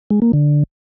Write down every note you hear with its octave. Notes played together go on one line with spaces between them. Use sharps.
G#3
A#3
D3